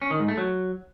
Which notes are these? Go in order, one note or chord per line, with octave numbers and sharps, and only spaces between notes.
C#4
D#3
G#2
A3
F#3